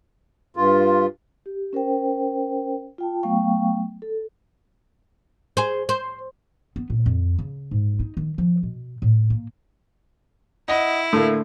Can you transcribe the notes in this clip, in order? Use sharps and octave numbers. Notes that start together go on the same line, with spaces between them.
G2 F4
G4
C#4 A#4 C5 G5
F4 G5 A5
F#3 A3 B3 F5 G5 C#6
A4
G#4 C5
C5
B3
A#2
F2
C#3
G#2
D#4
D#3
F3
B2
A2
A#3
E4 D#5 F#5
A2 D3 A3 A#3